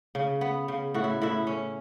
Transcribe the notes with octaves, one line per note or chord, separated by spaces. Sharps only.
C#3
B3
C#3
A2 F#4
E4
A2 E4
C#4